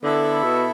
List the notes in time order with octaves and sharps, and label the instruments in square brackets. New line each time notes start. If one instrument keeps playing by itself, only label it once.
[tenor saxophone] D3 [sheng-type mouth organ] B3 E4 A4 E5
[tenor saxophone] B2